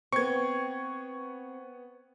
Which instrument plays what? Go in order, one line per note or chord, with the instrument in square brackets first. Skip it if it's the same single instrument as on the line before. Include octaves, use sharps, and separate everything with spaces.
[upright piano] B3 C#7 [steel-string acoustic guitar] C4 [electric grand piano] C#6 G#6